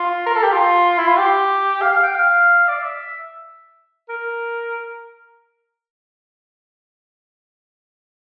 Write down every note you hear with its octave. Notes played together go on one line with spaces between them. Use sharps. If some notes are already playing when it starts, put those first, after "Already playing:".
Already playing: F4
A#4
A4
G4
F4
E4
F4
G4
F5
F5
G5
F5
D5
E5
A#4